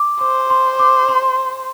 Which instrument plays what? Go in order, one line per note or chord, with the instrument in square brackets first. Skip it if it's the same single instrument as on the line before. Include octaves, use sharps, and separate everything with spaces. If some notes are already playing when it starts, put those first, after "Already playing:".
Already playing: [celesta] D6
[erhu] C5 [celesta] D6
[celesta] C6
D6
C6